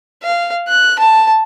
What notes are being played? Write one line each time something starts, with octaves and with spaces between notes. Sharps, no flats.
F5
F#6
A5